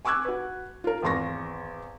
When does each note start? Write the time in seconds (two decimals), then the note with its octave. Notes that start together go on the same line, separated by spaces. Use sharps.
0.05 G#5 C#6 D6 E6 F#6 G#6
0.25 F#4 B4
0.84 F4 A#4
1.03 G#1 E2 C6 C#6 A#6